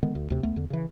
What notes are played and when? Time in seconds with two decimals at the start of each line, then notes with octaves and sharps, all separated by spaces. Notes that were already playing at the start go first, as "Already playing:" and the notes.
0.03 D3 D#3 G#3 B3
0.15 D2
0.30 D2 C3
0.43 C#2 A3 B3
0.56 E2 D3
0.70 C#3 E3